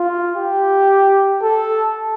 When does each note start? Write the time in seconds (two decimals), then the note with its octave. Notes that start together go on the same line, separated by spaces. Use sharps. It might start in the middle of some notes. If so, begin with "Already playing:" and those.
Already playing: F4
0.36 G4
1.42 A4